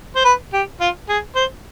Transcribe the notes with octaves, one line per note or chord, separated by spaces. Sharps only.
C5
B4
G4
F4
G#4
C5